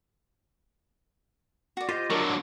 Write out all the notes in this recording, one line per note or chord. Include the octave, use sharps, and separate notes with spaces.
F#4 D5
F4 G4 C5 D#5
D3 F#3 A#4